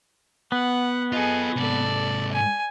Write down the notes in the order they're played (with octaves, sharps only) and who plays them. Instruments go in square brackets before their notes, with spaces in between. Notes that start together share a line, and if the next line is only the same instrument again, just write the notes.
[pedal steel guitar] B3 [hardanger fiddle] F#5
[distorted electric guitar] F4 A4 [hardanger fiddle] G#4 D#5
[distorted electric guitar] G#2 C3 [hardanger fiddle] A4 D5
[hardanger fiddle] G#5